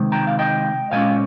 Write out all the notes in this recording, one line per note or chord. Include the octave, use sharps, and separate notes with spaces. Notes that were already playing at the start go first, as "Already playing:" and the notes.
Already playing: C3 D#3 G#3
G5 A#5
F5
D#5 G5
A#2 G#3 C#4 F5 G#5